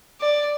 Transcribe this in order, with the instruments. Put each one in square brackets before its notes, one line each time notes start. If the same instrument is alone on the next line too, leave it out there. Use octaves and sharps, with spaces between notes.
[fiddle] D5